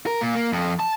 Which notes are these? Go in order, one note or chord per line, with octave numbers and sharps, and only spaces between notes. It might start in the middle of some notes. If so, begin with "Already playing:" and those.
A#4
A#2
A#3
F2
A5